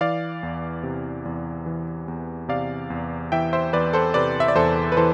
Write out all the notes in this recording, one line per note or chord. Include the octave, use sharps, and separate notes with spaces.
E3 D5 F5
E2
C3
E2
E3
E2
C3 D5 F5
E2
E3 E5 G5
C5 E5
E2 B4 D5
A4 C5
C3 B4 D5
E5
D5
E2 A4 C5
B4
E3 A4 C5